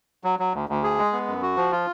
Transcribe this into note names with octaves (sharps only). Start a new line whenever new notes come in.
F#3
F#3
D2
D2
G#4
G#3
B3
F#2
F#4
F3
F4